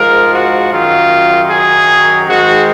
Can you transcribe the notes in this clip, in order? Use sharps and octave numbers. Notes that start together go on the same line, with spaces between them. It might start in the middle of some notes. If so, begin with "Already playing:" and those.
Already playing: G#2 F3 G#3 A#4
F#4
F#2 D#3 F#3 F4
G#4
G#2 D#3 G#3 F#4